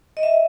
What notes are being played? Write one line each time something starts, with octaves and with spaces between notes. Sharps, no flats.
D#5
E5